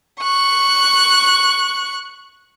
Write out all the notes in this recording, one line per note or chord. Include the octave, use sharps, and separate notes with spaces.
C#6 F#6